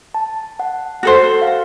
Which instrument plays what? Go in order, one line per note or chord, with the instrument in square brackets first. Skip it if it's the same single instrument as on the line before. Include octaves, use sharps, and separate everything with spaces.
[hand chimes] A5
F#5
[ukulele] F#4 A4 C5
[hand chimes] F5
F#5